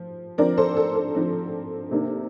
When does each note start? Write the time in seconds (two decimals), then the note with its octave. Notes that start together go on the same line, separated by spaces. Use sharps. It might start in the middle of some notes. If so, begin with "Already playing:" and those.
Already playing: F3
0.38 D3 F3 C4 A#4 D5
0.57 A4 C5
0.77 A4
0.95 A4
1.15 D3 F3 C4
1.91 C3 D#3 A#3 D4